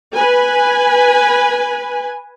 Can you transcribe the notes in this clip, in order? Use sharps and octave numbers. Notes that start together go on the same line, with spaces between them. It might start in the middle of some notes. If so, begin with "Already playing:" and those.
B4 G#5